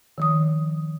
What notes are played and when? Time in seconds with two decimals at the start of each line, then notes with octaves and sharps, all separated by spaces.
0.18 D#3 F3 D#6